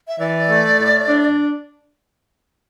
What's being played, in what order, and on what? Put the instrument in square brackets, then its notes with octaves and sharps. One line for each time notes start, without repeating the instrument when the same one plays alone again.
[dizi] E5
[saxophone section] E3 [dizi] D5
[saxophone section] A3
A2
D4